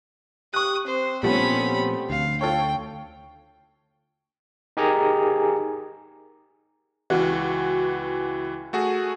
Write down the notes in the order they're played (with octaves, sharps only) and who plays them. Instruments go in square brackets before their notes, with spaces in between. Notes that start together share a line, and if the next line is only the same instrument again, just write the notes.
[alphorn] G4 [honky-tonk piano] C#6 F#6 [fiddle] D#6
[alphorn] C4 [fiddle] C5
[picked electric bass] A#2 F3 [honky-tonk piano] G3 A3 B3 [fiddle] C#4 B5
[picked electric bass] D2 [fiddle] F5
[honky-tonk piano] F4 A4 C#5 [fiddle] G5
[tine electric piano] D#4 G4 G#4 A#4 G#5 A#5
[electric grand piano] C#2 E3 [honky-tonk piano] F#4
[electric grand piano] A3 F#4 G#4